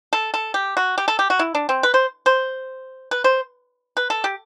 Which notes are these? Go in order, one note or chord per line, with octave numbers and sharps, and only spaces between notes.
A4
A4
G4
F#4
G4
A4
G4
F#4
E4
D4
C4
B4
C5
C5
B4
C5
B4
A4
G4